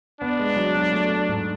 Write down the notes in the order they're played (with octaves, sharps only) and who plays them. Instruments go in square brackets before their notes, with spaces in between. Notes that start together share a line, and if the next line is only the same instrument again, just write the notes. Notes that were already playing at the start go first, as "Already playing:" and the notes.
[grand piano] B3 [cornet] D4
[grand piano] G#3
F#3
F#3
A3
A3
G#2